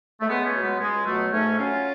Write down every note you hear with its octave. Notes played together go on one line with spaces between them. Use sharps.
A3
C#2 G#3 B3
A3 C#4
B2 F#3
G#3 B3
C#2 G#3
B2 F#3 A3
G#2 A3 C#4
F#3 C#4 F4